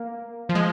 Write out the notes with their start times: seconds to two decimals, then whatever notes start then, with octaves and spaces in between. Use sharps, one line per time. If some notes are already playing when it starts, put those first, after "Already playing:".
Already playing: A#3
0.49 F3
0.55 G#3